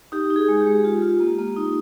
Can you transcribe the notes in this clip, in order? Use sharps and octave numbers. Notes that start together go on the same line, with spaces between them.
D#4 G4
D#4
G#4
G#3
G4
G#3
F4
F4
A#3
A#3
D#4